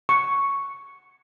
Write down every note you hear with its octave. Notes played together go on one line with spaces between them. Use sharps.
C#6